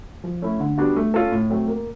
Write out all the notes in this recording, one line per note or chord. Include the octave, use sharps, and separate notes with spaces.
F3
A3 C#4 E4
D3
G3 B3 D4 F#4
A3
C#4 F4 A4
A2
F#3 A3 C4
A#3